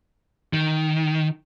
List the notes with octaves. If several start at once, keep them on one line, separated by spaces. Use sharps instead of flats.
D#3